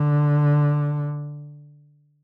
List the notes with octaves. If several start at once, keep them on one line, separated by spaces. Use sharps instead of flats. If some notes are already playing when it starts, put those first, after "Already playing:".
Already playing: D3